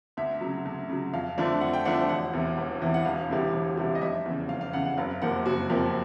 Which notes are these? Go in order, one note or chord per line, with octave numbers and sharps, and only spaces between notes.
D2 E5
C#3 F#3
D2
C#3 F#3
F2 F5
D3 F3 A3 D4
F2 F#5
G5
D3 F3 A3 D4 F#5
E1 F#5
E2 C3 E3
E1
E2 C3 E3
F#5
E1 F5
D2 C3 E3 G3
E1
D2 C3 E3 G3
D#5
F1 E5
E2 C#3
F1 F5
F5
E2 C#3 F#5
F#5
F#1 F5
F2 C3 F3 A#3 F#5
F#1 F#4
F2 C3 F3 A#3